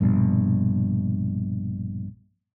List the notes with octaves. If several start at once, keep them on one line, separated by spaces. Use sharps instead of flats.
A#1 G2 B2